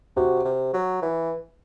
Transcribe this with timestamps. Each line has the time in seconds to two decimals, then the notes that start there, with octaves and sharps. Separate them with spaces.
0.16 C3 F#4
0.45 C3
0.74 F#3
1.02 E3